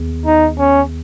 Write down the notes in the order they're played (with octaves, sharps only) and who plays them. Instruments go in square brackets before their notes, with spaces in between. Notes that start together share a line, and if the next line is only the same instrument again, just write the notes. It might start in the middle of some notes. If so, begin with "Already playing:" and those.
Already playing: [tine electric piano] D#2 D#3 B3 G#4
[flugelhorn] D#4
C#4